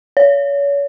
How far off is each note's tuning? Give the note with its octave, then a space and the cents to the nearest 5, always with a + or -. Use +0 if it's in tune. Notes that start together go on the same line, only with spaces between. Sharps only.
C#5 +35